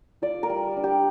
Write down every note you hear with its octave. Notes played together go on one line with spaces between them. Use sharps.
F4 D5
A#4
G3
D4
G4